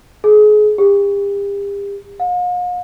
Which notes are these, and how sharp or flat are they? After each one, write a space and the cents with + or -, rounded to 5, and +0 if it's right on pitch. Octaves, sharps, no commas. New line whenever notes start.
G#4 +30
G4 +40
F5 +45